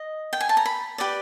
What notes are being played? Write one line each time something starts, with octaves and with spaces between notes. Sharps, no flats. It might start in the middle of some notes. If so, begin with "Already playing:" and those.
Already playing: D#5
G5
G#5
A5
A#5
B5
G4 B4 D5